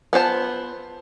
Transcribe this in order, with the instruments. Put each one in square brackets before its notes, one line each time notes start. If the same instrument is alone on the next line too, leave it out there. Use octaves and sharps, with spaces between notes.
[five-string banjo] B3 F4 C5 A5